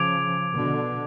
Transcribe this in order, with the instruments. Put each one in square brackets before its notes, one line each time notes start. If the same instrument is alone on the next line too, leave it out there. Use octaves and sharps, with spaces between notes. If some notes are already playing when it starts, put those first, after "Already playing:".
Already playing: [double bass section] C#3 F3 [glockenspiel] D6 G#6 D7 F7
[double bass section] B2 D3